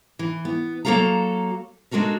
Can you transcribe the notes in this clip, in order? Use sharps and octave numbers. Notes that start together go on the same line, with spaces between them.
E3
B3
F#3 A#3 F#4 A4 F5 A#5
G#3 D4 F#4 A4 A#4